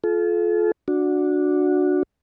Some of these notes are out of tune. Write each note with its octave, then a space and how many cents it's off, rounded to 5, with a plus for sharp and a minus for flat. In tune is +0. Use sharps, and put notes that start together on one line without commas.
F4 +0 A4 -40
D4 +0 F#4 -15